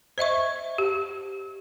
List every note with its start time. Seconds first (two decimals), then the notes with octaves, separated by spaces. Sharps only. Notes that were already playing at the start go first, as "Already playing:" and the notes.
0.18 C5 D#5 E5 C#6
0.78 G4